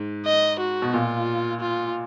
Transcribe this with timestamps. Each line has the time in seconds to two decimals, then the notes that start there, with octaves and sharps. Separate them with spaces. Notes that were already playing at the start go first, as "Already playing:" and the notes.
Already playing: G#2
0.26 D#5
0.60 F#4
0.82 B2
0.93 A#2 F4
1.60 F4